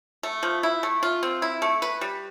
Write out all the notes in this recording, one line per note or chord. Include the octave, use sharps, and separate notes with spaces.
A3
F3
E4
A3
F4
C4
E4
A3
B4
G3